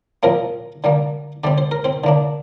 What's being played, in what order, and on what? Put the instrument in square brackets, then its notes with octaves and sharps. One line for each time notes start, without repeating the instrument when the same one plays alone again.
[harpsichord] A#2 F3 A#3 C4 A#4
D3 G3 A#3
D3 G3 C4 D5
C5
A#4
C4 C5
D3 A#3 D4